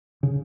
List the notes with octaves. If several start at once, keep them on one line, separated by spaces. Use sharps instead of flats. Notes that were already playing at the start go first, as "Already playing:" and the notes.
C#3